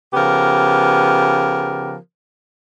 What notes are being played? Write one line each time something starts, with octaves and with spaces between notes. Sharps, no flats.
C#3 F3 B3 G4 A#4